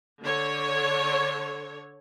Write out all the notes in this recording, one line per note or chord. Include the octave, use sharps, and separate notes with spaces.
D3 C#5